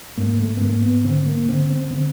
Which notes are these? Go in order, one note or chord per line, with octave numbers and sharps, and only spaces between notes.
G#2 A#3
A3
B3
G#2 A#3
B3
D3 C4
A#3
D3 C4
C4
D3 C4